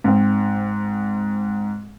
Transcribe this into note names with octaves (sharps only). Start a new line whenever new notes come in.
G#2 C4